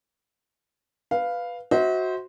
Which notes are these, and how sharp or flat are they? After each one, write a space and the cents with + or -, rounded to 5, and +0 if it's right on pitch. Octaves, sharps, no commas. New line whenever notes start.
B4 +0 F5 +0
F#4 +0 C5 -5 E5 -45